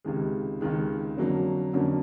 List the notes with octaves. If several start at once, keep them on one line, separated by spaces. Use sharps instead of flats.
C#2 C3 D#3 G#3
C#2 C3 D#3 G#3
F2 D3 F#3 A#3 C#4
F2 D3 F#3 A#3 C#4